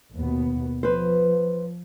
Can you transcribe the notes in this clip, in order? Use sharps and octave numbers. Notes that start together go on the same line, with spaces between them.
D#2 B2 B3
F3 B4 C5